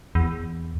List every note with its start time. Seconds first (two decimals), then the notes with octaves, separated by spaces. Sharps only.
0.15 E2